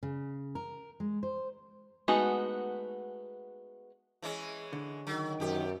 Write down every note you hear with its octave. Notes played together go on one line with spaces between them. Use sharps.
C#3
A#4
G#3
C5
G#3 A3 B3 D#4 F#4
E3 G#3 C#4
D3
D#3 F#3
F#2 B2 G4